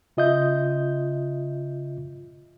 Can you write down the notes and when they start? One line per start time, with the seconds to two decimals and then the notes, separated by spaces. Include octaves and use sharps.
0.17 C#3 F4 D#5 E5 G6